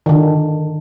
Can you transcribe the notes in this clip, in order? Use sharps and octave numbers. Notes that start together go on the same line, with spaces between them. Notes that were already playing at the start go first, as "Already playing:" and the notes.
D3 D#3